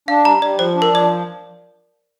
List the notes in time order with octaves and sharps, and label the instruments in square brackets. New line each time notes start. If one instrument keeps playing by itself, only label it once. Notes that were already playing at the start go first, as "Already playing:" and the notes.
[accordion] D4 [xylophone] F5
[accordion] G3 [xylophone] A#5
[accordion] G3 [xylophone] D5
[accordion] F3 [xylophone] C5
[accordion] D4
[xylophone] A#4
[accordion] F3 [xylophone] D5